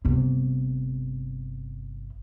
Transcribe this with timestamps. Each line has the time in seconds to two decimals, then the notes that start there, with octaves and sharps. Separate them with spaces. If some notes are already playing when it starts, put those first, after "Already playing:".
0.05 G1 C3